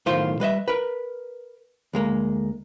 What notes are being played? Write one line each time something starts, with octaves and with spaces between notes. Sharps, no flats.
B1 A2 D#3 F4 C5 C6
G3 B4 D#5 E5
A#4 B4
D2 G#3 A#3